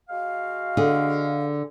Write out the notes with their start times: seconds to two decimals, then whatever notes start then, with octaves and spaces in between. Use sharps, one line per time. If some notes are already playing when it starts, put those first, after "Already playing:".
0.09 G#3 F#4 F5
0.77 D3 G#4